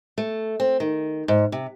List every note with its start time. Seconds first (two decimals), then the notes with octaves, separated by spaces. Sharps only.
0.18 A3
0.60 C4
0.80 D#3
1.28 G#2
1.52 C3